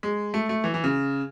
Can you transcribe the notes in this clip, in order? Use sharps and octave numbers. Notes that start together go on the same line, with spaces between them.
G#3
A3
A3
E3
E3
C#3